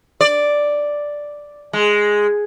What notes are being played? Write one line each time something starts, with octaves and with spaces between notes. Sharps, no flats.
D5
G#3